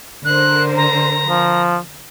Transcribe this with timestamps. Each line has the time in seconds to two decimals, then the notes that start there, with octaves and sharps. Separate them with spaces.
0.25 D3 A#4 C5 F#6
0.76 A#5
1.28 F3